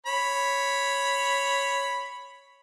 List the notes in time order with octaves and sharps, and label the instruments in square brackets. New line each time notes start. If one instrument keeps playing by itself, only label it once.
[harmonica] C#5 B5